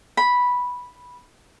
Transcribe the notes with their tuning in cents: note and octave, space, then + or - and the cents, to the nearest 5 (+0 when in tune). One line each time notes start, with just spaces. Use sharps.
B5 -5